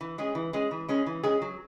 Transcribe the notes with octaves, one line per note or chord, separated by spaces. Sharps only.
E3
G#3 C#4 G#4
E3
G#3 C#4 G#4
E3
G#3 C#4 G#4
E3
G#3 C#4 G#4
F#3